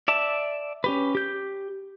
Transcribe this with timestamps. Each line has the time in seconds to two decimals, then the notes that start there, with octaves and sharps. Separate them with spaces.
0.08 D5 E5 A5
0.84 C#4 G4 B4
1.15 G4 G6